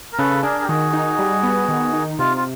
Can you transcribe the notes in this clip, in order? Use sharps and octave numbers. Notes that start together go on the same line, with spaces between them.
A#4
C#3 A4 B4
D4 G#4 A#4
G4
D#3 F#4 G#4
D#4
G3
B3
D#3
D#4
C3 F4
F4